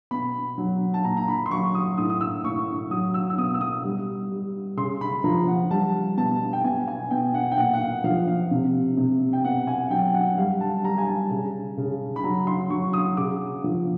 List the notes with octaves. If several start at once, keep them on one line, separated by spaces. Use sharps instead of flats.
B2 B5
F#3
A5
A#2 A#5
A#5
B5
C6
F#3 C#6
D#6
A2 D#6
D#6
E6
A2 C#6
F#3 D#6
E6
E6
B2 D#6
E6
D#6
G3
G3
C#3 C6
B5
F3 A#5
F#5
G3 A5
B2 A5
G5
B2 G#5
G#5
B2 G5
F#5
G5
A#2 F#5
F#5
F5
F3 F5
F5
C3
C3
G5
B2 F#5
G#5
F#5
F#3 G5
F#5
G3 F5
A5
G3 A#5
G#5
A5
C#3
C#3
B5
F#3 A#5
C6
F#3 C#6
D#6
C#3 D6
F3